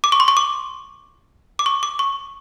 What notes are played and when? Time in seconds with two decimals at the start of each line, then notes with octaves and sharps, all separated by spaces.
0.04 D6
0.12 C#6
0.20 C6
0.28 C#6
0.37 D6
1.59 D6
1.66 C#6
1.83 D6
1.99 C#6